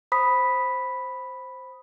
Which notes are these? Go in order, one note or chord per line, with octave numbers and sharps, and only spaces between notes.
C5 B5 D#6 B6